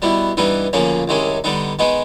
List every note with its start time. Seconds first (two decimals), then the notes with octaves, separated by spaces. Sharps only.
0.02 B2 G3 B3 E4
0.37 G2 E3 G3 B3 D#4
0.73 D2 C#3 F3 A#3 C#4
1.08 C2 C3 D#3 G#3 C#4
1.44 D3 G3 B3 D#4
1.79 D#3 G#3 B3 D#4